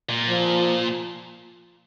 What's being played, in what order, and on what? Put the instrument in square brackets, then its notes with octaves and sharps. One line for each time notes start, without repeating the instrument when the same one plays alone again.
[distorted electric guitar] A#2
[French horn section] F3